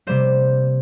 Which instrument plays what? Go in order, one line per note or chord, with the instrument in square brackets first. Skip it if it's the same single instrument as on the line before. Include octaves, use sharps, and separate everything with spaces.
[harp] C3 G3 A#3 C5